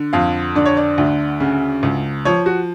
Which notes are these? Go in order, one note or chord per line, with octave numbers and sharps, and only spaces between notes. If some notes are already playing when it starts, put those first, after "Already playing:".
Already playing: D3
F2 F5
D3 D5
C#5
D5
D2
C#3
C#2
F3 C#5
F#4